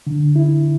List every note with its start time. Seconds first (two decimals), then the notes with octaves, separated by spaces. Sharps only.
0.07 D3
0.36 E4